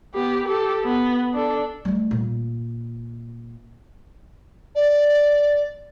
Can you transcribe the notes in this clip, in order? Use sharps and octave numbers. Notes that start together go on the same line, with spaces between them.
B3 G4
G4 A4
B3
D4 A4
G3 A3
A#2
D5